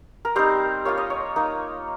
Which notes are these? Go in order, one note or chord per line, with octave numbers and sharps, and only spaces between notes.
A#4
G3 C4 D#4 C5
A#3 F4 C#5
D#5
C#5
A#3 D#4